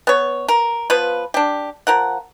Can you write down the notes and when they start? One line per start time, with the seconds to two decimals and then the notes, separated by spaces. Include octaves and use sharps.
0.07 B3 C#5
0.48 A#4
0.90 F3 B3 F4 B4
1.34 D4 G4
1.87 F3 A#4 F#5